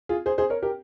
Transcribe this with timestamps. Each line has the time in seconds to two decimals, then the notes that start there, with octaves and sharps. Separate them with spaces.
0.09 F4 G#4
0.26 G#4 C5
0.38 G#4 C5
0.50 A#4 C#5
0.63 G4 A#4